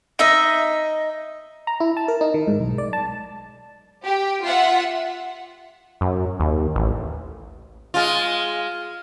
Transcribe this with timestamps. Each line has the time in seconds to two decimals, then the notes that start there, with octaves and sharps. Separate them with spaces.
0.19 D#4 D#5 E5
1.67 A#5
1.80 E4
1.97 A5
2.08 A#4
2.21 D#4
2.34 D#3
2.47 G#2
2.60 B1
2.78 D5
2.93 A5
4.04 G4
4.43 F4 E5 F#5
6.01 F#2
6.40 D#2
6.76 A1
7.94 G#3 F4